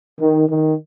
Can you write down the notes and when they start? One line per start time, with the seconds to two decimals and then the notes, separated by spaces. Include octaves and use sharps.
0.20 D#3
0.48 D#3